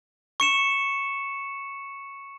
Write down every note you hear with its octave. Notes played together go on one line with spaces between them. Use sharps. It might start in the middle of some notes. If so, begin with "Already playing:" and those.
C#6 C#7 E7